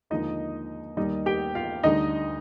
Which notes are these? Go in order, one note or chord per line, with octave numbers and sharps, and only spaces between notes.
D#2 D3 F3 G#3 D#4 D#5
D#2 D#3 G3 D#4 D#5
G4 G5
F4 F5
D2 D3 G3 D#4 D#5